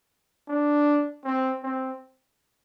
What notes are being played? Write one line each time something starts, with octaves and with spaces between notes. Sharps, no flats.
D4
C4
C4